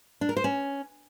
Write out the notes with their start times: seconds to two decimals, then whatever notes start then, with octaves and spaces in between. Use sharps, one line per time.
0.21 D4
0.29 A#4
0.37 C5
0.44 C#4